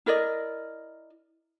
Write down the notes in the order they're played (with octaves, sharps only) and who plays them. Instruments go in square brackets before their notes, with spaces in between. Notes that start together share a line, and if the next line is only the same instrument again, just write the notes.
[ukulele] E4 A#4 D5 D#5